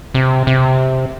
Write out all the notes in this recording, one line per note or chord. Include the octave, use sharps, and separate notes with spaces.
C3
C3